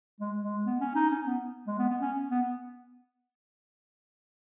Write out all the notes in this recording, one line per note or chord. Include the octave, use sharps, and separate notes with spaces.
G#3
G#3
B3
C#4
D#4
C#4
B3
G#3
B3
B3
C#4
B3